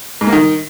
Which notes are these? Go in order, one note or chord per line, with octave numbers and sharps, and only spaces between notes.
G#2
A#3
D#3